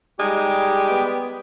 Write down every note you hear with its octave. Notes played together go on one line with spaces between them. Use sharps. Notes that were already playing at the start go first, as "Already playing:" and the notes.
G3 G#3 D#4 G4
B3